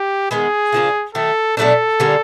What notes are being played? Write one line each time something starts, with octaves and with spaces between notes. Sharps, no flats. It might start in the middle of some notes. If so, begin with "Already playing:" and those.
Already playing: G4
D#3 G#3 B3 G#4
C#3 F3 A#3 D4
D#3 F#3 A3 A4
B2 F#3 A3 D4 A4
D3 G3 A#3 C#4